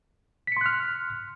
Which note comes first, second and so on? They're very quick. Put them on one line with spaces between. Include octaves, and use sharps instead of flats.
B6 C#7 C6 F#6 F6